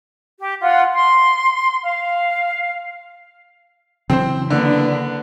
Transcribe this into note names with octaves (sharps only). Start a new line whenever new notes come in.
G4
F4 F#5
C6
F5
C#3 E3 F#3 C4 C5
D3 A#3 B3 D4